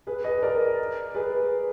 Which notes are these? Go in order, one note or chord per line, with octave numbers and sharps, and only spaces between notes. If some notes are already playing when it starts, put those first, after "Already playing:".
G#4 B4
B4 D#5
A#4 D5
G#4 B4